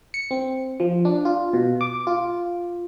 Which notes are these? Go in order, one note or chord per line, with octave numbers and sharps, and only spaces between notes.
C#7
C4
F3
D4
F4
B2
D6
F4